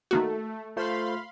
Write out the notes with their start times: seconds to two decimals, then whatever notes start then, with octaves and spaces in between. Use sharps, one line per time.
0.11 D#3 A3 A#3 F#4
0.77 A3 F4 C5 F5 B5 C6